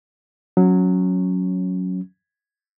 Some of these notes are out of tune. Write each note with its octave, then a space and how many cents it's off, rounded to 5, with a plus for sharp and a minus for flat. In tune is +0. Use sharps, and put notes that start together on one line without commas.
F#3 -10 C#4 +0